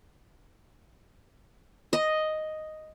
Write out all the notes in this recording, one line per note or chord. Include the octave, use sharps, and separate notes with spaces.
D#5